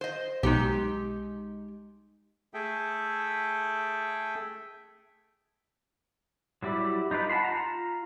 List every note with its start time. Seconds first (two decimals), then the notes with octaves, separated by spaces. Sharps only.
0.01 C5 D#5
0.43 B1 G#3 D#4 G4
2.54 A3 G#4 A4 E5 G5
6.63 F#3 G3 E4 D5
7.11 D#4 F4 A#4 B4
7.30 F#5 A5 B5 C6
7.44 F4 A#5